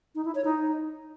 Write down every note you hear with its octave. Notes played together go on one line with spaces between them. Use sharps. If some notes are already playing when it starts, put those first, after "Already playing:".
D#4
E4
C#5
D#4